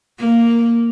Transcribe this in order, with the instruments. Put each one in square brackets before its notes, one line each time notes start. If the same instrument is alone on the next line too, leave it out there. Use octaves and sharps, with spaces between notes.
[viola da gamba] A#3